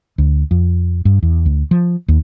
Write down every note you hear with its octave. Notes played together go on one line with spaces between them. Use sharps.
D2
F2
G2
E2
D2
F3
D#2